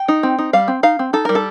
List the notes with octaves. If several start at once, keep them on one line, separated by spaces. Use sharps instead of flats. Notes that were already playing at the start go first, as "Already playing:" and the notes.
Already playing: G5
D#4
C4
D#4
G3 F5
C4
D#4 F5
C4
D#4 A4
G3 A#4
A4